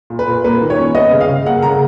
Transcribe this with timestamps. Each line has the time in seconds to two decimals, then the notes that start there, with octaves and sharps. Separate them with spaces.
0.10 A#2
0.19 B4
0.28 A#2
0.44 A#3 B4
0.61 D#3
0.70 C#5
0.79 C#4
0.95 B3 D#5
1.12 C#3
1.21 F5
1.29 C#3
1.46 A#3 F#5
1.63 C#3 A#5